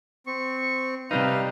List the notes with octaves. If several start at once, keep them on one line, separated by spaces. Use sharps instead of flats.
C4 C#6
C3 G3 D#4 B4 F5